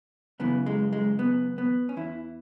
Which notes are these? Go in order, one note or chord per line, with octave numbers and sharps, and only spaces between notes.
F#2 C#3 E3 B3
G#3
G#3
B3
B3
C#4
E2 E3 E4